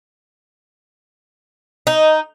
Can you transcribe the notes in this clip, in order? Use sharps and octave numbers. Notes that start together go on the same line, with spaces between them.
D#4